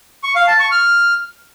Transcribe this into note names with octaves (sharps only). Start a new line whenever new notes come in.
C#6
F5
A5
C#6
F6